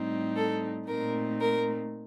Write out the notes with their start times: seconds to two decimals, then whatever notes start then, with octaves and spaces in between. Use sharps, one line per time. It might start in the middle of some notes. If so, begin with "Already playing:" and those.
Already playing: A2 G3 C4 D#4
0.36 A4
0.88 A#2 A3 C4 D#4 A#4
1.41 A#4